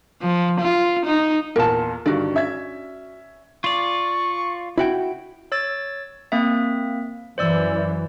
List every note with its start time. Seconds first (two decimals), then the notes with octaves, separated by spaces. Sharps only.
0.22 F3
0.61 F4
1.06 D#4
1.56 E2 A#2 A#4 A5
2.06 G2 D3 D#3 F#4 D5
2.34 C#4 E5 G#6
3.64 F4 D5 C#6
4.78 E4 F#4 G5
5.52 C#5 E6 A6
6.32 A#3 C4 E5
7.38 F#2 E3 C5 D5 E6